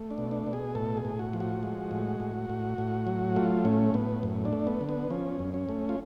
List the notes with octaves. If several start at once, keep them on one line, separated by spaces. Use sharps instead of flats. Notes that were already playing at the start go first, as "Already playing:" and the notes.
Already playing: A3
D4
B2
D4
B2
G#4
A2 A4
G#4
A2
F#4
F3
F#4
G#3
A2
A2
A2
A2
F#3
A3 F4
A2 C#4
A2 B3
F#2
D4
A3
B3
D3
B3
F3 C#4
F#2
C#4
A3
F4